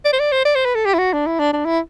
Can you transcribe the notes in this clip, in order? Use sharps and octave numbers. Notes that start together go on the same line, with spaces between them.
D5
C5
D5
C5
D5
C5
B4
A4
G4
E4
F#4
D4
E4
D4
D4
E4